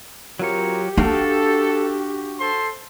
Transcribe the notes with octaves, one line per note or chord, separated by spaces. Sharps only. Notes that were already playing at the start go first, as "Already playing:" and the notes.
F#3 C4 F4 G4 A#4 C#5
D4 F#4 A4 F5 G5
A4 C5 C6